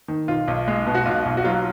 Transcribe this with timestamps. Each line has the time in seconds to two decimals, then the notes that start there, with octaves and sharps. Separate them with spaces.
0.08 D#3
0.28 B1 F4
0.48 B1
0.68 G#3
0.87 B2
0.95 F#4
1.05 B1 F4
1.25 B1
1.37 F#4
1.44 F#3 F4